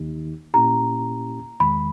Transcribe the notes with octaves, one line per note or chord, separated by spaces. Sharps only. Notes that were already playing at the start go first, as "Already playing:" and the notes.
Already playing: D#2 D#3 A#3 D#4 G4
A#2 A#3 C#4 E4 G4 A#5
E2 D#3 G#3 B5